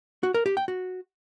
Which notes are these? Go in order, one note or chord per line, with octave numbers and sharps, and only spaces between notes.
F#4
A#4
G4
G5
F#4